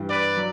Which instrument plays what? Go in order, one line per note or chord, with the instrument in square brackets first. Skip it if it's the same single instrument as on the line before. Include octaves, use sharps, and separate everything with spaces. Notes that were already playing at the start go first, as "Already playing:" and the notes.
Already playing: [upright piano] G2 E3 G3
[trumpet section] B4 D5
[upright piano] F#3